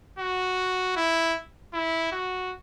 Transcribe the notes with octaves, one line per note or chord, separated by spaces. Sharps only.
F#4
E4
E4
F#4